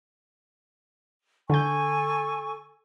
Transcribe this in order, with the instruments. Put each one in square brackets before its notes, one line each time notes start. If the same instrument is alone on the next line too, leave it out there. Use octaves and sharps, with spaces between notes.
[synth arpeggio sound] D3 G6 [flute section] A4 G#5 C#6